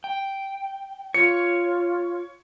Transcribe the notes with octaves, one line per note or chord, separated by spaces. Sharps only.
G5
F4 C#5 C#7